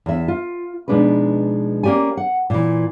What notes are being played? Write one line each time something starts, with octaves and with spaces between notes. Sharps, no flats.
E2 E5
F4
B2 F3 G#3 D4 D#4 B4
A#3 C#4 G4 D5 G#5
F#5
A#2 E3